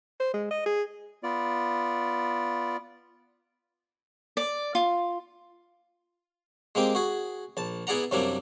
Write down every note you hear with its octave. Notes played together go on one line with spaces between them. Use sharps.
C5
G#3
D#5
G#4
B3 F4 D5
D5
F4
G#3 A#3 C4 G4
F#4 G#4
A#1 A5
B3 E4 G#4 D5 F#5 A#5
F#2 C3 G3 A#3 D4 E4